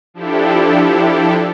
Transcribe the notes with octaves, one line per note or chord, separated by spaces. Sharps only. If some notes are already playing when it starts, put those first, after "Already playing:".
F3 D4 E4 G4 A4